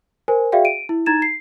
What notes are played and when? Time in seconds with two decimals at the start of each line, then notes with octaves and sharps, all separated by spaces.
0.28 A#4 C5 G#5
0.52 F#4 G#4 D5 E5 F5 G5
0.65 D7 D#7
0.89 E4
1.06 D#4 A#5 G#6 A6 E7
1.22 C7